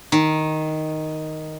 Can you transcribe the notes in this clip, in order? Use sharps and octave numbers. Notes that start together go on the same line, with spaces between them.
D#3